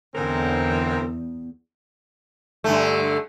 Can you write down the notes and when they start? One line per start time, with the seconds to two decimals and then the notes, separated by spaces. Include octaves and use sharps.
0.16 E2 G#2 D3 E3 F#3 C4 A#4
2.64 G2 D3 A3